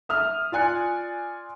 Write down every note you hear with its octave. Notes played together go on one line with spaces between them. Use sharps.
E5 D#6 F6
F4 D5 G#5 F#6 C#7